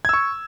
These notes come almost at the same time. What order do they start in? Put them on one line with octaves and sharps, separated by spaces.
G#6 E6 C#6